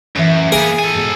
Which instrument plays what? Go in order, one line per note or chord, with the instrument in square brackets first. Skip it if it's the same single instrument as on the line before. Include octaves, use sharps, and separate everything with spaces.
[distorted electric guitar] F#2 [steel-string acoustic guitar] A2 E3 E5
[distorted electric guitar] A#3 B3 [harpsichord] G#4
[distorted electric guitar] A4 G#5
[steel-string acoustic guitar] G#2 B2